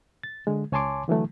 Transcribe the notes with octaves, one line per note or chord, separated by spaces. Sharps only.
A6
D3 G#3
C#2 C#5 G#5 A5 C6 D6
D3 E3 F#3 A3